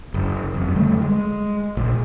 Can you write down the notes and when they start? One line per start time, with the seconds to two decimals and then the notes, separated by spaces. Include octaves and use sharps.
0.14 F#1
0.54 F#1 F2
0.75 D3 G3 A3
1.02 G#3
1.77 A#1